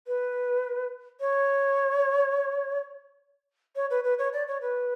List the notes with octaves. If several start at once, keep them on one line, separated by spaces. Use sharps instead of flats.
B4
C#5
C#5
B4
B4
C#5
D5
C#5
B4